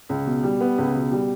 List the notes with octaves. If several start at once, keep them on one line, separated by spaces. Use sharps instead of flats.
C#2
B2
G3
B3
C#2
B2
G3